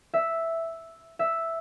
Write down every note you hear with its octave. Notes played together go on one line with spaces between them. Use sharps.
E5
E5